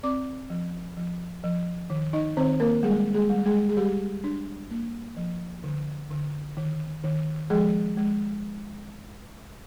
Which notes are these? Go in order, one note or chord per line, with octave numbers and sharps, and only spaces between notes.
C4 D5 D6
F3
F3
F3
D#3
D#4 D#5
D#3 C4 C5
A#3 A#4
G3 G#3 G#4
G#3 G#4
G3
G#3 G#4
G#4
G3 G4
D4
A#3
F3
D3
D3
D#3
D#3
F3 G#3 G#4
G#3